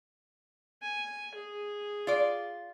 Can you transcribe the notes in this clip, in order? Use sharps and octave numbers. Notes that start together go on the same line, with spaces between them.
G#5
G#4
F4 D5